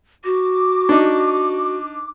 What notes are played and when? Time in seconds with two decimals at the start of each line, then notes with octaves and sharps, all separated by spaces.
0.25 F#4 D6
0.89 D4 D#4